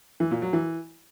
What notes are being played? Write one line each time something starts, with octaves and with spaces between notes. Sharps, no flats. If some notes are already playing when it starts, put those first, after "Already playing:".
E3
A#2
F#3
E3